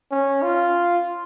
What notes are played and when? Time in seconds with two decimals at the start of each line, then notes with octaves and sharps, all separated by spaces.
0.11 C#4
0.42 F4